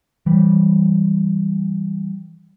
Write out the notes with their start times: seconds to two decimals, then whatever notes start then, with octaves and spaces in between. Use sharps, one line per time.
0.26 E3 G3